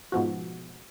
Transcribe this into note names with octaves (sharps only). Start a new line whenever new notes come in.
G#2 B2 F3 F#4